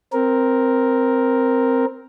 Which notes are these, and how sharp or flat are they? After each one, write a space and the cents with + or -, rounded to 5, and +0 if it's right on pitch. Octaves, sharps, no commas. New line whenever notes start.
C4 +0 A#4 +0